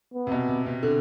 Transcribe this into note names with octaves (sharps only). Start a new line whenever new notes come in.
B3
C3
B2
C3
C3
D3